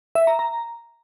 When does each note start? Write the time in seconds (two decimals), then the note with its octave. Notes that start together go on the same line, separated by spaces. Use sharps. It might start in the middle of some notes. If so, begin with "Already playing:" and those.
0.15 E5
0.27 A#5
0.39 A#5